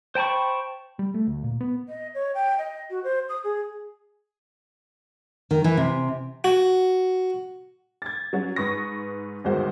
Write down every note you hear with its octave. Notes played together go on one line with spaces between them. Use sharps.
C5 G5 A5 B5 C#6
G3
A3
D2
A#2
B3
D#5
C#5
G5
D#5
F#4
C5
D#6
G#4
D#3
E3
C3
F#4
G#6 A6
F#3 C#4 F#4
G#2 B4 C#6 D#6 A#6
G1 D#2 G#2 G#3 F#4 C5